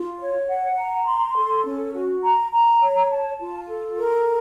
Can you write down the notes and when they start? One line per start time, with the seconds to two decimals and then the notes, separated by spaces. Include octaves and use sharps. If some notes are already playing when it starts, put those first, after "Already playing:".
Already playing: F4
0.19 C#5
0.48 F#5
0.77 A#5
1.06 C6
1.36 A4
1.65 C#4
1.94 F#4
2.24 A#5
2.52 A#5
2.81 C#5
3.11 A5
3.40 F4
3.68 A4
3.98 A#4